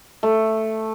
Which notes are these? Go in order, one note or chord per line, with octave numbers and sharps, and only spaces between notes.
A3